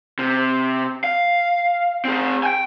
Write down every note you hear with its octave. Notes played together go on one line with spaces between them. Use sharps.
C3
F5
C4 G#4
G5 G#5